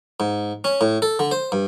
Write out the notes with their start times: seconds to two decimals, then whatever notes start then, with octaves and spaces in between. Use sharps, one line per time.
0.20 G#2
0.64 C#4
0.81 A2
1.02 A4
1.19 D3
1.31 C5
1.52 G2